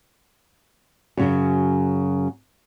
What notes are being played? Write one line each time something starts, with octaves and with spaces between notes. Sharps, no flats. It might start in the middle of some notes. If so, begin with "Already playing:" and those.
F#2 C#3 F#3